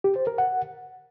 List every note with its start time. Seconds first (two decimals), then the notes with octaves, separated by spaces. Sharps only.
0.04 G4
0.16 C5
0.27 A#4
0.38 F#5